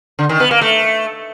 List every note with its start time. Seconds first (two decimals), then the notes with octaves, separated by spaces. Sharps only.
0.19 D3
0.29 D#3
0.40 B3
0.51 A#3
0.61 A3